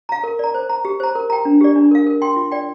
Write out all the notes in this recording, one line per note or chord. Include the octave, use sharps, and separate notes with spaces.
F5 A#5
A#4
D5 A#5
C5
A#5
G4
C5 A#5
A#4
G5 A#5
D4
G4 D5
D4
A#4 F5
A#4
G5 C6
F4
D5 G5